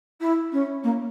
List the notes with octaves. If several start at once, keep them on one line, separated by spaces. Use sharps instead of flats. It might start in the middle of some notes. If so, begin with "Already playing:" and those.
E4
C#4
A#3